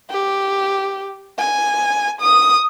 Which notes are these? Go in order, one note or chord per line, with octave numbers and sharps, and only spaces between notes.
G4
G#5
D#6